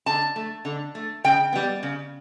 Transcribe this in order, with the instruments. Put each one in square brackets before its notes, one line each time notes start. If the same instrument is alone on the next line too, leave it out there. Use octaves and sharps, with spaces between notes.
[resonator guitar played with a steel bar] D3 A5
A3
D3
A3
C#3 G5
G3 B3
C#3